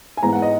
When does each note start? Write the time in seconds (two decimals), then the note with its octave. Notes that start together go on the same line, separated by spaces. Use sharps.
0.17 G#5
0.23 G#2 E3 B3 A#5
0.33 F#5
0.42 D#5